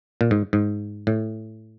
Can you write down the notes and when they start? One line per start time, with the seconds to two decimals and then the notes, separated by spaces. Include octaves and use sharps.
0.21 A#2
0.31 G#2
0.53 G#2
1.07 A2